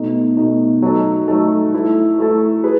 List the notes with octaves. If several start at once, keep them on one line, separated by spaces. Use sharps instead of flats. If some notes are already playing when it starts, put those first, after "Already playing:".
Already playing: B2 A3 D#4
B2 A3 D#4
F#3 A3 D#4 A4
F#3 A3 D#4 A4
A3 E4 A4
A3 E4 A4
G#4 B4